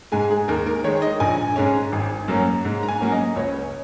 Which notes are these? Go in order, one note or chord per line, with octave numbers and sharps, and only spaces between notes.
G#2 G#3 G#5
G#4
D#2 A#4
A#4
D#3 G#3 C#5
D#5
A#1 G#5
G#2 G#3 C#4
G#1
F#2 F#3 A#3 C#4
G#2
A#5
G#5
F#3 A#3 C#4
D#5
C#2 C#5